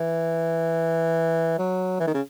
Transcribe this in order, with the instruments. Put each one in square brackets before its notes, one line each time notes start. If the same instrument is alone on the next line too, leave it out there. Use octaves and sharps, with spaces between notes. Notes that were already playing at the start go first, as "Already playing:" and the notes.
Already playing: [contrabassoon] E3
F#3
E3
D#3
C#3